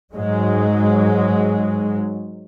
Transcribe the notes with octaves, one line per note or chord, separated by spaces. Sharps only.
G#2 F#3 G#3